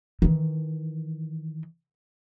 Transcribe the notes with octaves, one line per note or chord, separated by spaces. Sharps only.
D#3 E3